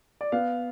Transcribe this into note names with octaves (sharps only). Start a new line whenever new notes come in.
D5
B3 F5